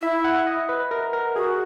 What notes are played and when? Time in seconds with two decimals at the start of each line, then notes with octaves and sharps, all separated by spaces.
0.02 E4 E5
0.24 F#5
0.47 D#5
0.69 B4
0.91 A#4
1.13 A#4
1.36 F#4 G#4